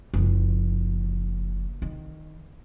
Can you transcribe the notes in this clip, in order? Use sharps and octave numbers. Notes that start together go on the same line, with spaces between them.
F#1 F3
D#3